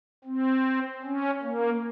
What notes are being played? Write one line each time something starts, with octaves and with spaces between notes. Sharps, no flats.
C4
C#4
A#3